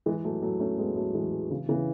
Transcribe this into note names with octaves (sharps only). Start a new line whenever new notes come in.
E3 G#3
F#3 A3
F#3 A3
A3 C#4
G#3 B3
F#3 A3
E3 G#3
C#3 E3
C#3 E3